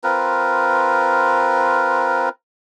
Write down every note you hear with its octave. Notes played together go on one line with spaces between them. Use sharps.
C4 F4 A#4 B4